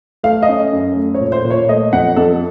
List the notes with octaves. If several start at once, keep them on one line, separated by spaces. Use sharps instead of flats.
A3 F5
D#5
C#4
F#2
A3
C#5
A#2
C5
A#2
C#5
A3 D#5
F2 F#5
F2 A4